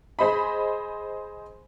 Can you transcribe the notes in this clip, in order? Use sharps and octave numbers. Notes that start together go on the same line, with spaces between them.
G#4 C5 D#5 B5